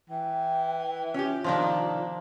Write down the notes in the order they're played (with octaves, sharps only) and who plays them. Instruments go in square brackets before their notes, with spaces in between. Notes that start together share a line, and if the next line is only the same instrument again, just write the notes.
[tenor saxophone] E3 [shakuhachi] G5
[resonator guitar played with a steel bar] C#4 G4 [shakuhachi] F4
[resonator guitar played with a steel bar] C3 D#3 D4 [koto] F3 A#3